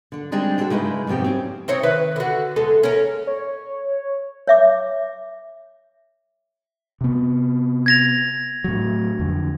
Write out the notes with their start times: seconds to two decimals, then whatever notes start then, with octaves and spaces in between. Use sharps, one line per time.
0.12 D3 D4
0.32 G3 G#3 C4 D4 D#4 G#4
0.58 G#3 D4 F#4 G#4 A4
0.70 C#3 G#3 D#4 E4 B4
1.07 F2 G#2 B2 C4 G4
1.24 C4 C#4
1.68 C4 D#4 C#5
1.83 D#3 B4 E5
2.16 D3 F#4
2.56 E2 G#3 A4
2.83 C#4 A#4
3.27 C#5
4.47 C#5 E5 D6
7.01 C3 B3
7.86 G#6 A#6 F7
8.64 A2 F#3
9.19 F2 D3